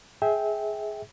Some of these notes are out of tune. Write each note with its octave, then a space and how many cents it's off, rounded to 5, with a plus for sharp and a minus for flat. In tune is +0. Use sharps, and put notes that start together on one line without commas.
G#4 +10 E5 -25 G5 +0